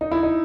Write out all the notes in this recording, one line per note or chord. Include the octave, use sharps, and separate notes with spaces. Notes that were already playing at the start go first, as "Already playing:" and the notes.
D#4
E4
D#4